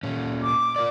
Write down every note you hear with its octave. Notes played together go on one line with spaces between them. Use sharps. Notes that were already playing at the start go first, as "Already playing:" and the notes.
A#2 C#4
D6
F4 A#4 D5